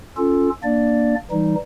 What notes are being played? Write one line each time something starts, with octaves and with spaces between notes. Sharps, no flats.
C#4 F4 A4
A#3 D4 D5
E3 G3 D#4